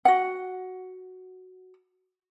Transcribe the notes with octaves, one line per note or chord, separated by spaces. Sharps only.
F#4 F#5